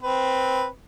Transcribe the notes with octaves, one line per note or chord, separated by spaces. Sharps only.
C4 B4